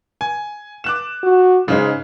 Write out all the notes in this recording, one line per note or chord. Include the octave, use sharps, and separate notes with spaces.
G#5
D6 F#6 E7
F#4
G#2 C#3 G#3